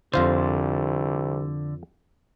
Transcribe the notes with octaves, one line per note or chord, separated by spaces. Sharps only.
C2 F2 D3 F4 C5